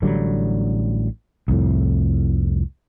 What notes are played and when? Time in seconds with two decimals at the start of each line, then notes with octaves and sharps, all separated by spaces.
0.02 A1 D3 F#3 G3
1.48 C2 F2 A2